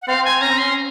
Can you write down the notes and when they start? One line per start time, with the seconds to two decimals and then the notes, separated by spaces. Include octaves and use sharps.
0.02 F#5
0.08 C4 F5
0.25 G#5
0.41 C#4 A#5
0.51 C4
0.58 C#4 C6